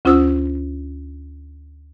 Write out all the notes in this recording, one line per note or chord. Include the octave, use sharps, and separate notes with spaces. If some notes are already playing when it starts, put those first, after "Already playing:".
D2 C#4 F4 C5 D#6 E6